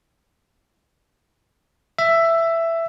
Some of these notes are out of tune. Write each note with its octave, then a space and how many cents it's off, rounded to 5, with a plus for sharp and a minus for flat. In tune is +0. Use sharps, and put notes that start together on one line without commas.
E5 +10